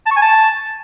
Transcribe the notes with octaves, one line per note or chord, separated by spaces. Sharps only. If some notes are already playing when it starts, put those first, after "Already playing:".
A5
C#6
G#5
A5